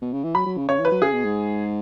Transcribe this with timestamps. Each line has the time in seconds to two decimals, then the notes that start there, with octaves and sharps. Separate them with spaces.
0.01 B2
0.13 C#3
0.24 E3
0.35 F#3 B5
0.46 F#3
0.57 C#3
0.68 C#3 C#5
0.79 E3
0.85 B4
0.91 F#3
1.02 C#3 G#4
1.13 B2
1.24 G#2